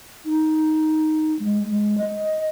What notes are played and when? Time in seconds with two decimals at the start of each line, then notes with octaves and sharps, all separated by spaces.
0.25 D#4
1.39 G#3
1.66 G#3
1.98 D#5